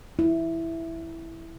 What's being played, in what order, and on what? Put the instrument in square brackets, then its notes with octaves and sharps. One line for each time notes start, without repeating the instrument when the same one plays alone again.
[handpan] E4